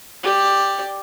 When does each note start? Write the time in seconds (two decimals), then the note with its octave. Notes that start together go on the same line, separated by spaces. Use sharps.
0.23 G4 D5